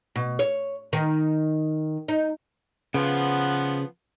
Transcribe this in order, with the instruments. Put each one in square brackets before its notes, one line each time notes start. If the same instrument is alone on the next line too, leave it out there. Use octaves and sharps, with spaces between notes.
[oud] B2
C#5
D#3
D#4
[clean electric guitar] C#3 [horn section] F3 B3